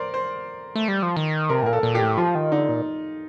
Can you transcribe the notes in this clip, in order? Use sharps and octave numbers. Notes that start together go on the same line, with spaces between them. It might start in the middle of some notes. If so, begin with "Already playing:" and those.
Already playing: A#4 C5 D5
C5
A3
G3
F3
D#3
C3 A#4
A2
A#2 A#4
A4
A#2
G4
A2
F3 F4
D#3
D3 D#4
A#2